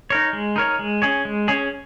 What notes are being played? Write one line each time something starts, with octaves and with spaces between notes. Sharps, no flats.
D#4 A#4 C#5
G#3
D#4 A#4 C#5
G#3
C#4 G#4 C#5
G#3
C#4 G#4 C#5